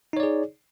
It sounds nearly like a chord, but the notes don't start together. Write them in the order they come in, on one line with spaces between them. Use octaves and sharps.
D#4 C#5 D5 G#4